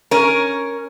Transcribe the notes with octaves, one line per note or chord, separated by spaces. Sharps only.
C#4 A#4